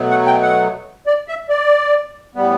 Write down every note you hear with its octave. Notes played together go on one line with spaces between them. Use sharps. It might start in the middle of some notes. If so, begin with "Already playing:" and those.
Already playing: B2 F#3 A3
F#5
G5
F#5
D5
E5
D5
A2 G3 B3